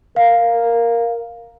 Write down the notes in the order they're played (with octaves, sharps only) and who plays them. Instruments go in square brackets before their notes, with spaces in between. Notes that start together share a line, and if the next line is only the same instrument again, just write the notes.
[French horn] A#4 [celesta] F5